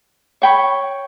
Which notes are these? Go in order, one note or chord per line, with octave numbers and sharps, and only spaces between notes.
C#5 G5 B5 C#6